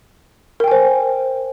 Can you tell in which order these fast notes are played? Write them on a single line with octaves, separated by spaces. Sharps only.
A#4 G5 G#5 C5